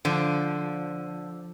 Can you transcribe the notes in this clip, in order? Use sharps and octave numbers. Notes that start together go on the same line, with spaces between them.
D3 F3